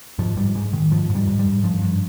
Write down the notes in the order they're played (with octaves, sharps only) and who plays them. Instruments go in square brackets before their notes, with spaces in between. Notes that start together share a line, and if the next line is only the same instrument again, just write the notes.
[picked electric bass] G#2 F3
G#2 G3
G#2 G#3
G#2 D#3
G#2 F3
G#2
G3
G#2
G3
G#2
G2 F3
G2